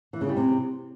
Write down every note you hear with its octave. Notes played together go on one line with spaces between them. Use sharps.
E3
C#3
G3
C3